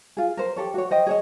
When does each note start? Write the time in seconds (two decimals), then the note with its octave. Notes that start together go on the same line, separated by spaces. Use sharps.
0.17 F4 G#4
0.37 A#4 C5
0.56 G4 A4 C#5
0.74 F#4 C#5
0.91 C5 D#5 G5
1.07 G#4 C#5 D#5